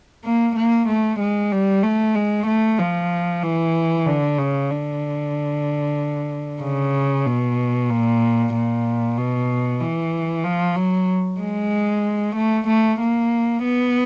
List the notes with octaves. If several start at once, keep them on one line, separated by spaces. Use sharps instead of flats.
A#3
A#3
A3
G#3
G3
A3
G#3
A3
F3
E3
D3
C#3
D3
C#3
B2
A#2
A#2
B2
E3
F3
F#3
G#3
A3
A3
A#3
B3